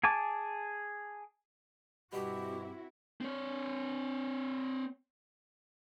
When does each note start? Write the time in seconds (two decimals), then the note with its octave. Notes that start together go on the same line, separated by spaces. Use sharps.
0.04 G#4 G#5 A5 D6
2.13 G2 B2 G3 C4 E4 F#4 G4
3.21 C4 C#5